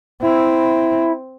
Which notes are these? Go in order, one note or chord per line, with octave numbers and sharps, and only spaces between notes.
C4 E4